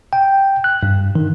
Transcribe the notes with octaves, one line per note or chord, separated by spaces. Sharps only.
G5
F#6
G2
D#3